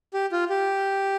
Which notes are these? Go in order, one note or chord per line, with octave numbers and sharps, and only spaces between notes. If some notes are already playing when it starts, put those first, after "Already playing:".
G4
F4
G4